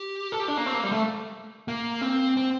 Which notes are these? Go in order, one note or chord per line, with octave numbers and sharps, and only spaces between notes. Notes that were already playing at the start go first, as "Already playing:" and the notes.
Already playing: G4
A4
G4
D4
A#3
C4
A#3
G3
A3
A#3
C4
C4